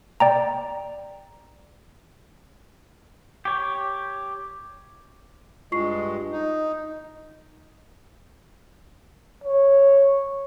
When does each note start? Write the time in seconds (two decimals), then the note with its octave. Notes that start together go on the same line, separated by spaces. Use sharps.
0.20 D5 G5 A#5
3.45 G4 C#5
5.72 G2 G#3 F4 C#6 C7
6.32 D#4
9.44 C#5